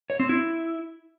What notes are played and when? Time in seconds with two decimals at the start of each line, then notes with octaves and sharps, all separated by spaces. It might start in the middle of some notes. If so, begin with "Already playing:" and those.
0.10 C#5
0.20 C4
0.29 E4